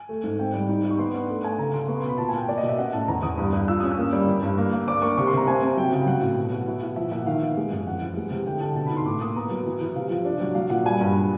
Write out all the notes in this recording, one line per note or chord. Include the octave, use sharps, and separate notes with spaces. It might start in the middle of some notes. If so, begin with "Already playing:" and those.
Already playing: G#5
A3
G#2
C4 G5
G3
D#4
D#4
C#6
B3 C6
D4 F#5
A3 F#5
A3 G#5
C#3 A#5
C#3 C6
B3 C#6
C6
B2
B5
A#2 A5
G#5
A#2 G5
A#3 D5
D#5
B2
E5
C#4 F#5
A2 A5
E2 A#5
E2 D#6
G2
G2
F4 E6
C#4 D#6
E6
A#3
G3
E3
G2
A#3
A#3
D4 D6
A#3 C#6
C3 C#6
C6
C3 A#5
C4 G#5
C4
F#3 G5
C#3 G5
F#3 F#5
A2
B2
B2
E4
E4
F3 E5
A#2 E5
F#5
D#3 F5
B3
G#3
F#2
F2 F#5
E3
G#3
C3
D3 G5
D3 A5
B2 A5
B5
D#4
C6
A2 D6
A#3 D#6
B3 A#5
F#3
E3
E3
C3 F5
F3
D4
F#3
F#3 F5
A#2 F#5
G3 G#5
G2